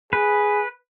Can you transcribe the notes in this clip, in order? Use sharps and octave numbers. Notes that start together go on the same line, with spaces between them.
G#4 B4